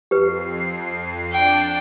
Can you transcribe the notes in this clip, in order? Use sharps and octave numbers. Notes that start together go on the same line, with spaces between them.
F2 G4 B4 C7
D4 D5 G5